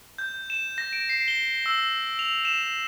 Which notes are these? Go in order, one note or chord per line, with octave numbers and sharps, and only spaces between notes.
G6
E7
A#6
D7
C7
G7
E6
F7
E7